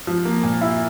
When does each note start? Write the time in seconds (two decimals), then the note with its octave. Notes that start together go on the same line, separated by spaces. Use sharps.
0.07 F3
0.25 A#3
0.43 A#2
0.61 E4